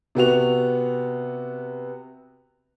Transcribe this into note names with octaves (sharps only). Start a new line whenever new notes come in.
C3 B3 F#4 F7